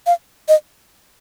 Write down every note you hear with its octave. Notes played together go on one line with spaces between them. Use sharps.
F5
D#5